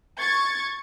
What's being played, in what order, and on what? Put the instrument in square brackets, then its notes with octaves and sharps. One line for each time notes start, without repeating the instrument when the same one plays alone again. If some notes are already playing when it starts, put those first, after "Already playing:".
[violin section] C#6 G#6 A6